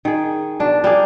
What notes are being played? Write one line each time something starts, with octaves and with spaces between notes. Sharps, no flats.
D#3 G#4
B2 D4
G3 A#3 G#4